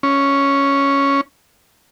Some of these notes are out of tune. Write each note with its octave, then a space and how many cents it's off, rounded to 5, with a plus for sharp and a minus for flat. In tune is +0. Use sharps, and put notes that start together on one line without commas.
C#4 +5